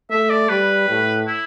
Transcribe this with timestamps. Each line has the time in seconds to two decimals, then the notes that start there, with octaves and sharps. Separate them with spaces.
0.11 A3 E5
0.30 D5
0.49 G3 B4
0.89 A2
1.28 E4